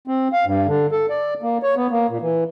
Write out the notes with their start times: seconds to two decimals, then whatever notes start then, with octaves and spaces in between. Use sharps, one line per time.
0.08 C4
0.33 F5
0.45 G2
0.67 D3
0.92 A4
1.10 D5
1.42 A#3
1.63 C#5
1.76 B3
1.91 A#3
2.10 A#2
2.21 E3